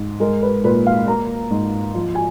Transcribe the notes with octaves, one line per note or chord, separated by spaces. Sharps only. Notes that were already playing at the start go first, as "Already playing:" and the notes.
Already playing: G#2
G#3 A#4
B4
A#2 B4
F5
A#3 A#5
G#2
F3
G#5